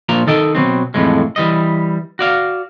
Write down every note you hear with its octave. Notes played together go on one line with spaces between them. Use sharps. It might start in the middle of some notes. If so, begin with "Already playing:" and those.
A#2 F3 A#3 A#5
D#3 A4 D#5 G5
B2 F#3 C4
F2 A2 E3 G#3
E3 G3 D#5
F#4 D5 F5